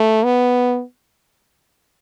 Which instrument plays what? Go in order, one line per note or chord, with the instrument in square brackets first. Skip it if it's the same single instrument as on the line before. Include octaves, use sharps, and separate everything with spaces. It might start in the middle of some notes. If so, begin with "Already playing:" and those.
Already playing: [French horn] A3
B3